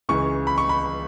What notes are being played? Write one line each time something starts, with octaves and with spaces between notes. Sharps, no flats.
C#2 C#3 E3 C#6
B5
C#6
B5